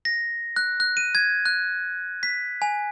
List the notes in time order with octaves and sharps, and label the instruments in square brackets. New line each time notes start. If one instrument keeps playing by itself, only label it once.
[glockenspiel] A#6
F#6
F#6
D#7
G#6
F#6
B6
G#5